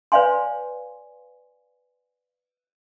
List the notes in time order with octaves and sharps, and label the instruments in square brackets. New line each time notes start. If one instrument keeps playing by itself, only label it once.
[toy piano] B4 C#5 D5 F5 G#5 C6